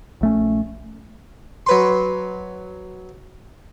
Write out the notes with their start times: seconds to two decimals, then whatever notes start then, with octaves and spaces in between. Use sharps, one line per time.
0.21 A#1 A3 C#4
1.67 F#3 B4 C6